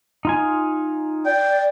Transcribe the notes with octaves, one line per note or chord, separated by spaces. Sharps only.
D#4 F4 G#5
D5 G5